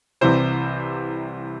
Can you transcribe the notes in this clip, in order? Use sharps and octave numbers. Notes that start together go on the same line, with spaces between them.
C2 C3 E3 C5